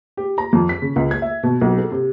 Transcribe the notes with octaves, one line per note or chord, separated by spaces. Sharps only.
G4
A#5
F2
B6
C#3
C#2
G#6
E5
B2
B1
A4
C3